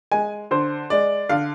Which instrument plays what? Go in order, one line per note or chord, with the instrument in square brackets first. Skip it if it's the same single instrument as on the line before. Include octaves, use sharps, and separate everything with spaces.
[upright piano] G#3 G#5
D3 C5
G#3 D5
D3 F5